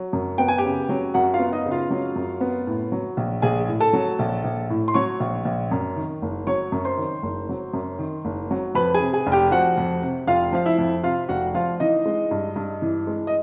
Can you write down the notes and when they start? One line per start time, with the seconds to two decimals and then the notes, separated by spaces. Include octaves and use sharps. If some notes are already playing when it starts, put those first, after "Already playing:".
Already playing: F#3
0.13 F#2
0.38 B3 G5
0.48 G#5
0.58 G4 G5
0.64 C#3
0.89 F#3
1.14 F#2 F#4 F#5
1.34 F4 F5
1.39 B3
1.52 D#4 D#5
1.65 C#3
1.71 F4 F5
1.91 F#3
2.16 F#2
2.41 B3
2.67 A2
2.92 F#3
3.17 A#1
3.42 A#1 G#4 G#5
3.68 A2
3.80 A4 A5
3.93 F#3
4.19 A#1
4.44 A#1
4.70 A2
4.88 C6
4.94 F#3 C#5 C#6
5.20 A#1
5.45 A#1
5.72 F#2
5.96 D#3
6.22 F#1
6.47 F#3 C#5 C#6
6.72 F#2
6.85 C5 C6
6.98 D#3
7.23 F#1
7.49 F#3
7.74 F#2
7.99 D#3
8.25 F#1
8.51 F#3
8.75 F2 B4 B5
8.94 G#4 G#5
9.00 C3
9.13 G#4 G#5
9.27 F1
9.32 G4 G5
9.51 F3 F#4 F#5
9.78 F2
10.02 C3
10.27 F1 F4 F5
10.52 F3 F5
10.66 E4 E5
10.78 F2
11.03 C3 F4 F5
11.29 F1 F#4 F#5
11.54 F3 F4 F5
11.80 E3 D#4 D#5
12.06 G#3
12.31 G2
12.56 G2
12.82 E3
13.07 G#3
13.27 D#5